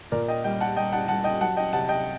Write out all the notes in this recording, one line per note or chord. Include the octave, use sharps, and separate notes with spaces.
A#2 A#4 D5
D#5 G5
G3 D#5 G5
F#5 A5
G3 D#5 G5
F#5 A5
G3 F#5 A5
D#5 G5
F#3 F#5 A5
D#5 G5
C3 F#5 A5
D#5 G5